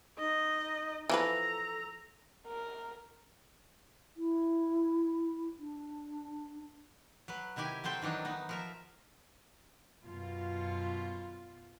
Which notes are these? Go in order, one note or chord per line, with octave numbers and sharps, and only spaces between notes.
D#4 D#5
E3 F3 A4 B4 A#5
A#4
E4
D4
F#3 B4
C3 D#3 E4 G4 G#5
F#3 C4 A4 C5 G5
D#3 E3 F#3 D4 D#4
B3 D#4
F3 A#4 E5
F#2 B2 F4